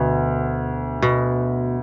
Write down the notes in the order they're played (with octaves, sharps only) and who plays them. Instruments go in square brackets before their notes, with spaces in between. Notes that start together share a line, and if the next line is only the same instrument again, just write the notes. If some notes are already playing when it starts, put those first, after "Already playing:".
Already playing: [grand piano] D2 [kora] B2
[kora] B2